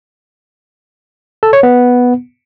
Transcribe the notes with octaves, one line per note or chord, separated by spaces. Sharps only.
A4
C#5
B3